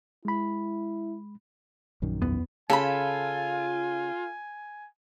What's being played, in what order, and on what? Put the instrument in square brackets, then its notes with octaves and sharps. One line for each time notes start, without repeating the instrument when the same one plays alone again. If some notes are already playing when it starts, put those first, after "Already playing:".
[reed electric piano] G#3 B5 [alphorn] E4
[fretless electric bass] A#1 F#2 D#3
[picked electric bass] E2 B3
[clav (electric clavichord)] C#3 [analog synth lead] F4 [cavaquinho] A4 B5 [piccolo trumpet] G#5